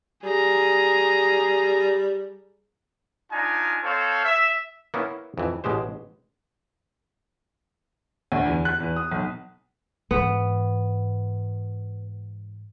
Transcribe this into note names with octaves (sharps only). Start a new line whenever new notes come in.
G3 G#4 A#5
D4 D#4 F4 G#5
C4 A4 C5 C#5 F5
E5
A#3 B3 C#4 E4
F2 E3
A1 B2 G#3 G4 C5
D2
E2
F#6
E2
D#6
B1
G#2 E3 B3